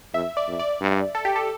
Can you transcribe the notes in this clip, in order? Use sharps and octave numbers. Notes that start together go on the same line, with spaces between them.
F2 E5
D5
F2
D5
G2
A4
G4
A4